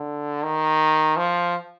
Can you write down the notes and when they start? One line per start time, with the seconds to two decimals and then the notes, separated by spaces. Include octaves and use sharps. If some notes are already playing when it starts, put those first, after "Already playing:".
Already playing: D3
0.43 D#3
1.17 F3